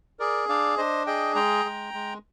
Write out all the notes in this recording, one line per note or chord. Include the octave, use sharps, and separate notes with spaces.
G#4 A#4 D5
D4 D5 F5
D4 C5 D#5
G#4 D#5 G5
G#3 G5 A#5
G#3
G#3